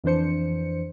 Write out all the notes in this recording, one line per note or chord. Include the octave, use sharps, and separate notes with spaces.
F2 E3 D4 C5 C#7